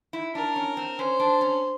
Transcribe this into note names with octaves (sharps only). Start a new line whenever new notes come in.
E4
D4 A#4
C#4
C4
C#4 C5
D4
C#4